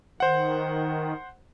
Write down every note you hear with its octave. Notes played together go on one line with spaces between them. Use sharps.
D#3 C5 F#5